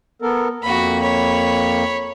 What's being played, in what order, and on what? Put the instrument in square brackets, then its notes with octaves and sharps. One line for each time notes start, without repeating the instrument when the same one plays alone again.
[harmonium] B3 A4 A#4
[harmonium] F2 A#3 [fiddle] F#4 B5
[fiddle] C#5 B5